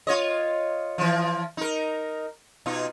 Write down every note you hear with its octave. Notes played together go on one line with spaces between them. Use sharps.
F4 C#5 D#5
E3 F3
D#4 A#4
B2 D#4 F4